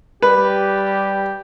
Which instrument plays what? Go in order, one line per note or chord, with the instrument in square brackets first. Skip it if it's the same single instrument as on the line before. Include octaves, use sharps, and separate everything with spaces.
[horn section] G3 G4 [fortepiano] B4